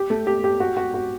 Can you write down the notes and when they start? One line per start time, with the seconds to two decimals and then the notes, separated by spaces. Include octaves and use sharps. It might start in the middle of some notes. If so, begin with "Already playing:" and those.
Already playing: G4
0.10 A3
0.27 G4
0.44 G4
0.60 F#4
0.77 F#4
0.94 F#4